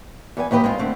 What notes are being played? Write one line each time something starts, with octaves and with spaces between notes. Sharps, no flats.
E2 B4 G#5
D#2 E3 G4 B4 D#5
G#3 C4 F4
D3 A3 C4